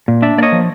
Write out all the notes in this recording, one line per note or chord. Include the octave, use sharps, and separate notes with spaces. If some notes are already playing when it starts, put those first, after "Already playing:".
A#2
D4 D5 E5
A#3 C#5 D5 D#5
F3